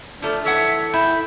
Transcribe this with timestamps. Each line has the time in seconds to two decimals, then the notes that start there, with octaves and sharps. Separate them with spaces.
0.22 F3 A3 D4
0.45 E3 A4 C#5 E5 F#5
0.94 E4 G5